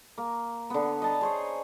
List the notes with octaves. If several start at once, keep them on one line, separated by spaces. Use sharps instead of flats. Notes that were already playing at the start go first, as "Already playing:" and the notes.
A#3
D3 B3
D#5 A5 A#5
G#4 C5 C#5